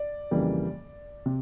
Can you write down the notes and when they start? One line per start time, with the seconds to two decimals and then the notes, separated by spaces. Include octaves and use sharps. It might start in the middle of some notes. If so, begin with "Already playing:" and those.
Already playing: D5
0.31 F2 C#3 E3 G3 A#3
1.26 C3